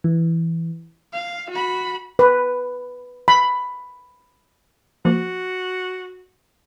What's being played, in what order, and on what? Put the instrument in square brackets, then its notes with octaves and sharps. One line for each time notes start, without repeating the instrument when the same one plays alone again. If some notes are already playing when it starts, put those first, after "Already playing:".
[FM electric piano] E3
[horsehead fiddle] F5
F#4 B5
[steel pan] B4
B5
[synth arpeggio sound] F3 A#3 [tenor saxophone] F#4